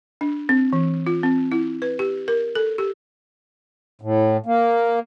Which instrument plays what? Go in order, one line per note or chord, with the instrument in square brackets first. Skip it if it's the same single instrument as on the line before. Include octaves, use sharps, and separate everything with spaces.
[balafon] D4
C4
E3
F4
C4
E4
B4
G4
A#4
A4
G4
[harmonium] A2
A#3